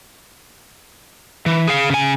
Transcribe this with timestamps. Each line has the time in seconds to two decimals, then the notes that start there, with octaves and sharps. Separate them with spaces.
1.46 E3
1.67 G#4 F5
1.90 C#3 G#5